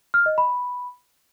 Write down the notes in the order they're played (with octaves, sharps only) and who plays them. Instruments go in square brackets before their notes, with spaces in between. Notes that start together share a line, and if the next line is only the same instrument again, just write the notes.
[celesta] F6
D#5
B5